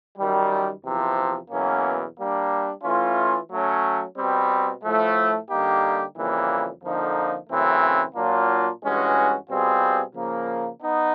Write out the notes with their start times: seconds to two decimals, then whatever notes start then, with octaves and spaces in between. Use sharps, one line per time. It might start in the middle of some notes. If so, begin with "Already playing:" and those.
0.18 F#2 D#3 G3
0.84 E2 C3 F3
1.50 E2 B2 F#3 A#3 C#4
2.18 G3 A#3 D4
2.83 E3 A3 C#4 F4
3.50 F#3 A3 C#4
4.16 B2 G3 C4
4.83 A2 F3 A3
5.50 D3 G3 A#3 D#4 G4
6.16 F2 C#3 E3 G3 A#3
6.82 F2 D3 F3 A#3 D#4
7.50 F#2 C#3 E3 A3 C4
8.15 A#2 F#3 A#3 D4 F4
8.82 G2 E3 G#3 C#4 F#4
9.49 B2 G3 C4 F4 G#4
10.15 C#3 F3 A#3
10.82 B3 D#4